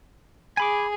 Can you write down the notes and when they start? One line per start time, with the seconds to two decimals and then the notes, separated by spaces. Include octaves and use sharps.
0.57 G#4 G#5 B5 D6